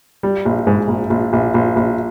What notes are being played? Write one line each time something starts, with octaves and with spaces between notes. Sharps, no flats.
G3
A#1
G#2
A#1
A#1
A#1
A#1
A#1